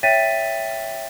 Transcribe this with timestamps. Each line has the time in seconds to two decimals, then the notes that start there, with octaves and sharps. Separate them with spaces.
0.03 C#5 E5 G5 A6 B6 D#7